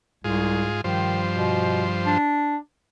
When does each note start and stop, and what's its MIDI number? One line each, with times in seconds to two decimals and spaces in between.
0.24 0.66 36
0.24 0.81 44
0.24 0.81 65
0.24 0.81 68
0.84 2.18 43
0.84 1.22 51
0.84 2.18 53
0.84 2.18 72
1.36 1.85 47
2.06 2.57 62